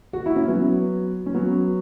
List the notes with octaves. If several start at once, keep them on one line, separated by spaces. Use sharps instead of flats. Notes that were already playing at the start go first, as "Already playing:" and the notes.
F#4
E4
C#4
F#3 B3
C#4
F#3 B3